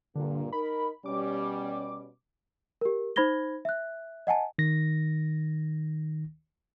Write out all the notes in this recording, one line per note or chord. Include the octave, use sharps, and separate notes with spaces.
G2 A#2 D3 A#3
D#4 A#4 B5
B2 G3 C#4 D6
G4 A#4
D#4 C5 B5 G#6 A#6 G7
E5 F#6
D#5 F#5 G#5 A5
D#3 A#6